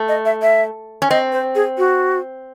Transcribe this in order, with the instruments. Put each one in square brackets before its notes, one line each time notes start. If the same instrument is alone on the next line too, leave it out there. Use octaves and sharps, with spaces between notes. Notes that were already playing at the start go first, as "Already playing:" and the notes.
Already playing: [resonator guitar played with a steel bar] A3
[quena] D#5
E5
E5
[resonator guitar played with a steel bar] C#4
[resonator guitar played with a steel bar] C4 [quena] D#5
[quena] C5
G#4
F#4